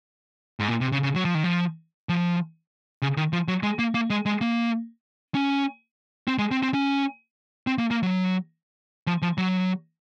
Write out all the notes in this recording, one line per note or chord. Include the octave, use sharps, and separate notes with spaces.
G#2
A#2
C3
C#3
C#3
F#3
F3
D#3
F3
F3
C#3
D#3
F3
F#3
G#3
A#3
A#3
G#3
G#3
A#3
C#4
C4
G#3
C4
C4
C#4
C4
A#3
A#3
F#3
F3
F3
F#3